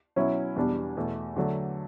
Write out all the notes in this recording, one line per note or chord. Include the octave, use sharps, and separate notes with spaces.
B2 F#3 C#4 E4
E2 B2 G3 D4
E2 B2 A3
D3 F#3 A3